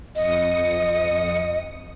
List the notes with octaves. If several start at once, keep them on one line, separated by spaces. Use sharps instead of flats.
F2 D#5 D#6 C#7